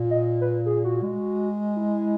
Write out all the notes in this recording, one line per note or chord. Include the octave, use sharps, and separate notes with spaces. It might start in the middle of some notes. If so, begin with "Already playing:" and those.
Already playing: A#2
D#5
B4
G#4
F#4
G#3
E4